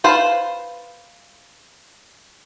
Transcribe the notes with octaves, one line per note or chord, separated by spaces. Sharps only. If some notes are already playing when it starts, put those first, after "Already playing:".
B4 C5 F5 A5